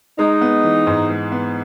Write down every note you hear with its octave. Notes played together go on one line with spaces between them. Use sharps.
G#3 D#4
B3
E3
G#2
G#3
B3